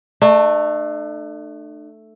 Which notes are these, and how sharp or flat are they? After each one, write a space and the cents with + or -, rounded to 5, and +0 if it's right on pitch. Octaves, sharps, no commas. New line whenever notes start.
A3 +0 D4 +45